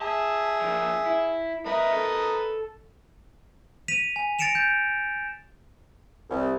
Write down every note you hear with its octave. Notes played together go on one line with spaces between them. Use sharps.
G#4 E5 A5
F3 D4
E4
F#2 A#4 B4 D#5 E5
A4
B6 D#7 F7
G#5
A6 A#6 C#7 D7 E7 F7
G6
C2